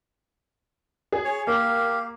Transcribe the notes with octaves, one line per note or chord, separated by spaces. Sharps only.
G#4
C#5
A#3 G4 F5